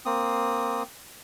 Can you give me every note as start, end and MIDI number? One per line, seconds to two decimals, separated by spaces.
0.06 0.83 58
0.06 0.83 60
0.06 0.83 87